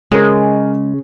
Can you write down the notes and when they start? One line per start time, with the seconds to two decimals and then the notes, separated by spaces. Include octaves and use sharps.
0.11 C#3 G#3 G#4 A#4